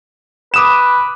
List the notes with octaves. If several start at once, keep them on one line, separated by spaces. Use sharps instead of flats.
B4 D6 D#6 E7